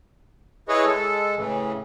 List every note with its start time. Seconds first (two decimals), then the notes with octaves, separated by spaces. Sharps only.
0.69 E4 G#4 B4 C#5 D#5
0.86 G#3 A4
1.37 A2 C#3 E3